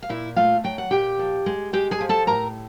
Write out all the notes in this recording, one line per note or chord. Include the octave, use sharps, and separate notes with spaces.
F5
A#2 E4 E5
A3 F4 F5
F#3 G5
F#5
A#2 G4 G5
F3
G#3
G#3 G4 G5
G#4 G#5
F3
A4 A5
A2 A#4 A#5